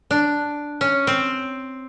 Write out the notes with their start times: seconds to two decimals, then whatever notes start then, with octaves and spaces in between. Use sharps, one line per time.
0.11 D4
0.81 C#4
1.07 C4